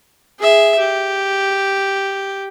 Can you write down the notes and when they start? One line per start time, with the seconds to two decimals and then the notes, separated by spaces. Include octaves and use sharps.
0.39 G#4 E5
0.78 G4